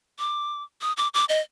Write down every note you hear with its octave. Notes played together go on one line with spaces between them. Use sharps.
D6
D#6
D6
D6
D#5